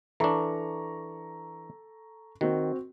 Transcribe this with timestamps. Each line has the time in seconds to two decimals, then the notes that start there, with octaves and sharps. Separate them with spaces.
0.20 E3 D4 A4 A#5 C#6
2.41 D#3 C4 F#4